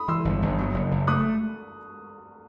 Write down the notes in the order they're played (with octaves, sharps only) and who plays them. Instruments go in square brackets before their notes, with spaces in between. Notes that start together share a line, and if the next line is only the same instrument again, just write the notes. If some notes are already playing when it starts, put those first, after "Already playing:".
Already playing: [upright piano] B5 D#6
[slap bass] E3 [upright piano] C6 E6
[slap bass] G1
G1
F#3
F#1
F#1
[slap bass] A3 [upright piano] D#6 F#6